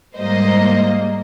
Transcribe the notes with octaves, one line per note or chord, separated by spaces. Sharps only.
G#2 G3 A#3 C5 D#5